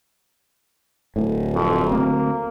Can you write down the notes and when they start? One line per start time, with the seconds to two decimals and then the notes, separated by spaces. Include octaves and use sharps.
1.16 D1 A2
1.55 F2
1.91 D2 A#3 C4